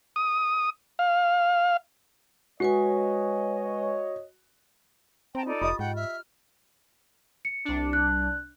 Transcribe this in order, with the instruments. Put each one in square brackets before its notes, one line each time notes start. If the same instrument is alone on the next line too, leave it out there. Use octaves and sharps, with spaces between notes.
[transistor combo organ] D#6
F5
[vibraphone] G#3 B4 G#5 [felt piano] F#4 [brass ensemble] C#5 D#5
[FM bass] C4 [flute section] G5 A5 A#5
[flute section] D#4 A4 D5 [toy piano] F4
[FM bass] F1 [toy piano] F4 G4 D#5 [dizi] D#6
[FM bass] G#2 [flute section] F#5 [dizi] G5
[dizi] E5 [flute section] F6
[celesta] C#7
[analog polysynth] C2 D4
[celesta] F#6